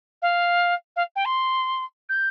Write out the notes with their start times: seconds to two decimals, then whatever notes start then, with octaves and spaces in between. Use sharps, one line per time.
0.22 F5
0.96 F5
1.15 G5
1.25 C6
2.09 G6